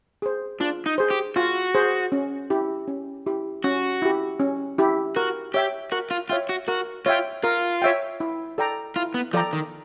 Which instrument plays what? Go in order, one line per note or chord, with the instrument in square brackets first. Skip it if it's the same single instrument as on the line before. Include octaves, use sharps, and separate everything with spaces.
[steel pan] G#4 C5
[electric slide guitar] D4 [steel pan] F4
[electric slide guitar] D#4
[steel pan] G#4 C5
[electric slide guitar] G4
[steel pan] F4 [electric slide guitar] F#4
[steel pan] G#4 C5
C#4
E4 G4
C#4
E4 G4
[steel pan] C#4 [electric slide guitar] F#4
[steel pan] E4 G4
C#4
E4 G4
[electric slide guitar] F#4 [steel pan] A#4
[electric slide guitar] G4 [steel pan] C#5 E5 G5
[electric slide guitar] F#4 [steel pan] A#4
[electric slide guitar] F4
[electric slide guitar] F4 [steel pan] C#5 E5 G5
[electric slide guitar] F#4
[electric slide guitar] F#4 [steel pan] A#4
[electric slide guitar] F4 [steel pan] C#5 E5 G5
[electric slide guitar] F4 [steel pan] A#4
[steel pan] C#5 E5 G5
E4
A4 D5 G5 A#5
[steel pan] E4 [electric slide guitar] F4
[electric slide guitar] B3
[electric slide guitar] F3 [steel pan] A4 D5 G5 A#5
[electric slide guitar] D#3